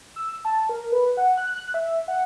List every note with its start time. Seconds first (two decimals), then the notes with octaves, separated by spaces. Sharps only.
0.16 E6
0.45 A5
0.69 A#4
0.92 B4
1.17 F#5
1.38 F#6
1.53 F#6
1.74 E5
2.08 F#5